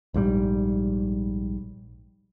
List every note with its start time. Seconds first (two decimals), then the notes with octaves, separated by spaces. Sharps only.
0.14 A#1 G#2 B2 G3